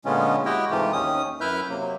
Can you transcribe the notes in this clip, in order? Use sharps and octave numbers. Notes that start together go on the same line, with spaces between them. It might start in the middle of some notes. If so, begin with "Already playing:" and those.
A#2 D3 G#3 B3 C#4 F4
G#3 E4 F#4 G4 D#5 G5
G#2 C3 E3 A3 F4 G4
D#2 D#3 C#4 D#6
F#2 E4 B4 E5 F6 G6
C3 F#3 A#3